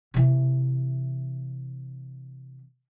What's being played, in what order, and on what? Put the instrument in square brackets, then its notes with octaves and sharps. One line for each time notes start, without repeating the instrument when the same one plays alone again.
[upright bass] C3 E3